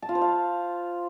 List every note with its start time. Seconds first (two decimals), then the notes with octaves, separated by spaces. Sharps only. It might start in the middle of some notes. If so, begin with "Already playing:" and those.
0.02 A5
0.09 F4
0.15 C5
0.22 F5